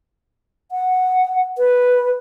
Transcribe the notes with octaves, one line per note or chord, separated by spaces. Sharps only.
F#5
B4